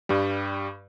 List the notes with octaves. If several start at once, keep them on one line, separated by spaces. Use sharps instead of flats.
G2 G3